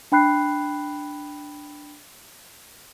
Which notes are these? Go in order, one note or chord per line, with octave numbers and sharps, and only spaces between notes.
D4 G5 B5 F#6 C7